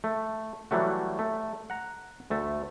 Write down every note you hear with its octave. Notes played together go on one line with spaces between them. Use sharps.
A3
E3 F#3 G3 A3 F#4
A3
F#5 A#5
D2 A3 A5